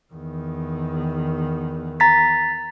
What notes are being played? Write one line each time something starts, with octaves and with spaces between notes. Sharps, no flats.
E2 D#3
A#5 A6 B6